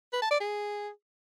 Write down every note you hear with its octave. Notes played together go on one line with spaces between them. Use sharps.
B4
A5
D5
G#4